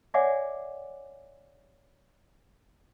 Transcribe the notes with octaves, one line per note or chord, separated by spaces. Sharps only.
C#5 D5 E5 F#5 G#5 D6